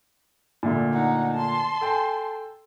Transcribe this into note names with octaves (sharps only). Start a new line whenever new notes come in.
A#2 D3 A3
D#4 F#5
A5 C6
A4 G5 G#5